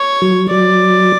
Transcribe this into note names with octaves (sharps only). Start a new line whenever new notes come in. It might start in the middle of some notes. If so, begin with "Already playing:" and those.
Already playing: C#5
F#3
F#3 D5